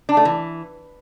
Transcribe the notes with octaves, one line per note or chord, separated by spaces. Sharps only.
D4
A3
E3